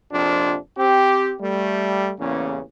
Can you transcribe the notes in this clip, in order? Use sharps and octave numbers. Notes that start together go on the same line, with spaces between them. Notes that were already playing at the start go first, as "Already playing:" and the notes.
A#1 F2 C3 F3 D4
C4 G4
G3 A3
A1 E2 C#3 A#3 C#4